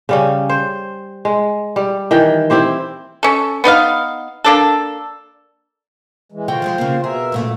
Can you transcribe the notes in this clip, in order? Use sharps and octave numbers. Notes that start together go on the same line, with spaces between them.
C#3 G3 C#4
C5
G#3
G3
D#3 E3 G5
C4 E4 G4 C5
C#4 A4
B3 D#4 D5 F5
A#3 D4 A4
E3 G#3
D3 F4 F#4 C5 G5
F3 F#3 G#3
C#3 A#3
B2 G#4 A#4 E5
F#2 A#2 A3